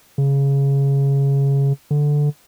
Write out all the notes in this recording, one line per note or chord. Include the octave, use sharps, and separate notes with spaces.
C#3
D3